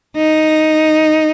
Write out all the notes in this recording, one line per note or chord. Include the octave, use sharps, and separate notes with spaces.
D#4